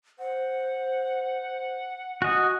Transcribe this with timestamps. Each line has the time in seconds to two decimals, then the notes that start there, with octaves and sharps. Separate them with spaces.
0.19 C5 F#5
2.22 F#4 D#5 G#5